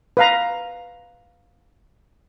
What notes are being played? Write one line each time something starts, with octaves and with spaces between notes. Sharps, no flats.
B4 F5 A#5